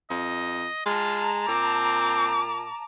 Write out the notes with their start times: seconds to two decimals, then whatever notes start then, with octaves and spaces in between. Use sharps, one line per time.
0.10 F2 D#5
0.86 G#3 F4 A5 A#5
1.48 A#2 C4 D6